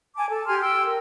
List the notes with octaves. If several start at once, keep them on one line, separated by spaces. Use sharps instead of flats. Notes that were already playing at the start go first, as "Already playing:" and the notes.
G#5 A5 D6
A4 A5
G4 G#5 C6 F6
G5 E6
A#4